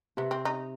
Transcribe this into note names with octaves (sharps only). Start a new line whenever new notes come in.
C3 B3
C4
D#4